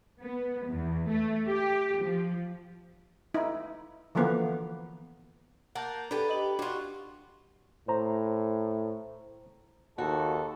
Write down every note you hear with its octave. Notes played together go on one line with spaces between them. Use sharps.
B3
E2
A3
G4
F3
D#4 E4
D3 E3 F3 A#3 B3
A#3 F#5 A5 G6
B3 D4 G4 A4
D#5 F#7
D4 F4 F#4
A2 C5 A#5
D#2 F#4 A4